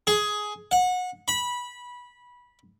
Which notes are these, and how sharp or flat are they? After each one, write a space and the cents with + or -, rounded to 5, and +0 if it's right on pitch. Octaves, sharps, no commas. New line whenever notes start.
G#4 +10
F#5 -25
B5 -15